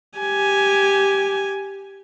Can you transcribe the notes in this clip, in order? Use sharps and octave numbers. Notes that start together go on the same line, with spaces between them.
G4 G#5